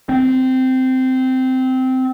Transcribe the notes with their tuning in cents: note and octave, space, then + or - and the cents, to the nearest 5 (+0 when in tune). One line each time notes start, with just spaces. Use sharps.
C4 -15